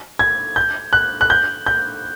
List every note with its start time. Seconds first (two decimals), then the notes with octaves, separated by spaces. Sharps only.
0.19 G#6
0.56 G6
0.93 F#6
1.21 F#6
1.30 G6
1.66 G6